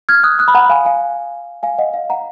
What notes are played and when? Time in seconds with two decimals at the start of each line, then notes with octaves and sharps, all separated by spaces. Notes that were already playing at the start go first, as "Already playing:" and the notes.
0.09 F6 G#6
0.24 D#6 F#6
0.39 D#6 F#6
0.48 B5
0.54 F#5 A#5
0.70 F5 G#5
0.85 F5 G#5
1.63 F5 G#5
1.78 D#5 F#5
1.94 F5
2.10 F#5 A#5